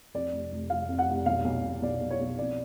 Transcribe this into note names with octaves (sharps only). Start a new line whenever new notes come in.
F2 D5
F1
F1
F1 F5
F2
F#5
F1
B1 F5
B1
B1
B1 D5
B1
C#5
B1
F2 D5